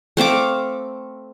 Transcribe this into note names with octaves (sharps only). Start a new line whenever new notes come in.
A3 C4 F5 D6